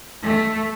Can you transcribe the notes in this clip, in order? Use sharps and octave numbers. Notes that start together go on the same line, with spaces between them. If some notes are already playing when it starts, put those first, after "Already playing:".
A3